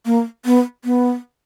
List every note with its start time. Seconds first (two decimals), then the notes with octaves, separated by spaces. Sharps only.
0.06 A#3
0.45 B3
0.85 B3